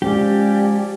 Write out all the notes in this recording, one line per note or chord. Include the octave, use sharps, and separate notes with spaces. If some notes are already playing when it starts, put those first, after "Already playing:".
F3 G#3 C#4 G4 D5